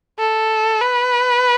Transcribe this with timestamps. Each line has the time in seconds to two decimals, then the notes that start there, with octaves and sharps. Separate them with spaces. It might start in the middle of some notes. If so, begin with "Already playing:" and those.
0.19 A4
0.82 B4